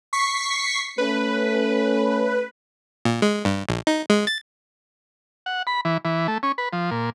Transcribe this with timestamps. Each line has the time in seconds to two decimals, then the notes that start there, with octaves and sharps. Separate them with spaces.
0.13 C#6 B6 C7
0.98 A3 C#4 B4
3.05 A#2
3.22 G#3
3.45 G2
3.69 A#1
3.87 D#4
4.10 G#3
4.27 A6
5.46 F#5
5.67 B5
5.85 E3
6.05 E3
6.28 A3
6.43 C#4
6.58 B4
6.73 F3
6.91 A#2